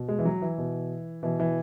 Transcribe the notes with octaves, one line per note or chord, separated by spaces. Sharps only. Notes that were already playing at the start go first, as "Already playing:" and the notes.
Already playing: B2
G#3
E3
F#3
E3
B2
B2 E3
E3